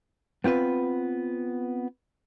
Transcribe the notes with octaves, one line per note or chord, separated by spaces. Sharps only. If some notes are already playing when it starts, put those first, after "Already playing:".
B3 C4 F4 B4